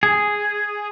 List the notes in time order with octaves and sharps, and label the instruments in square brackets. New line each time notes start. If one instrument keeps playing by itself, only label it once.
[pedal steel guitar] G#4